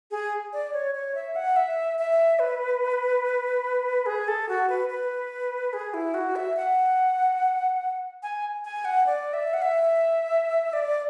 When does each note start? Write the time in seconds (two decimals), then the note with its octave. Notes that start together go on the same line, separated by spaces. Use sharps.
0.11 G#4
0.53 D5
0.73 C#5
0.95 C#5
1.15 E5
1.36 F#5
1.56 E5
1.99 E5
2.39 B4
4.06 G#4
4.28 A4
4.49 F#4
4.69 B4
4.89 B4
5.73 G#4
5.94 E4
6.14 F#4
6.36 E5
6.56 F#5
8.23 G#5
8.65 G#5
8.85 F#5
9.07 D5
9.33 E5
9.54 F#5
9.62 E5
10.73 D5